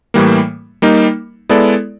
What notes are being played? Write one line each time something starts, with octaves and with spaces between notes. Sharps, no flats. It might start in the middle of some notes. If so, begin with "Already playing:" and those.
A2 E3 G3 A#3
G3 A#3 D#4
G#3 B3 E4 A4 D5